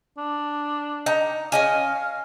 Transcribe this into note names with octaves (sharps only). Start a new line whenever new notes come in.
D4
D#4 A#5
C#4 D#5 F5 G#5